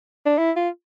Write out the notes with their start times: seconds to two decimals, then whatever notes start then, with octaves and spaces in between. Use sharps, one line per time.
0.26 D4
0.39 E4
0.56 F4